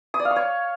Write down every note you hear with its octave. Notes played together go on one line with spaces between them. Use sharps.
D#6
D5
F5
C#6
C#5